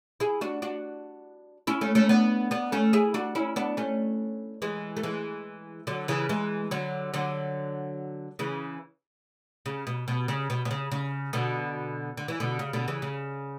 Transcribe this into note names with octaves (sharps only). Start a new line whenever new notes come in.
E4 G#4
D4 F#4
D4 F#4
C#4 E4
A3 C#4
A3 C#4
B3 D4
B3 D4
A3 C#4
E4 G#4
D4 F#4
C#4 E4
B3 D4
A3 C#4
E3 G#3
A3
E3 G#3
D3 F#3
C#3 E3
E3 G#3
D3 F#3
D3 F#3
C#3 E3
C#3
B2
B2
C#3
B2
B2
C#3
C#3
B2 D3
D3
E3
B2 D3
C#3
B2 D3
C#3 E3
C#3